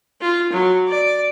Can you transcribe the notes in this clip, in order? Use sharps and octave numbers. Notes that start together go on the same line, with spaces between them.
F4
F#3
D5